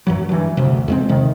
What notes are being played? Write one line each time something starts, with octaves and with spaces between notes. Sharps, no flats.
F#2 E3 F#3
G2 E3
D#1 D2 C3
E2 G#3 C4
D#1 C3 D#3